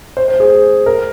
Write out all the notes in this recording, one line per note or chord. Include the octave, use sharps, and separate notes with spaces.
C5
C5
G#4
A#4